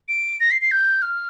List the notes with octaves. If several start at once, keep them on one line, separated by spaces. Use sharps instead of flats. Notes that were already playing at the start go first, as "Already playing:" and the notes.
D7
A#6
C7
C7
G6
F6